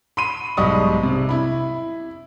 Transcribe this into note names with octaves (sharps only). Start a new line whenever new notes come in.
B5 C6 D#7
B1 G#2 G3 D#5 C#6 D#6
C3
E4 B5